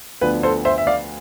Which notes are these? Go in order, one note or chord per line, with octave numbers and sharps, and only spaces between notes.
D2 D3 F3 B3 D4 B4
A4 C5
C5 E5
E5
D5 F5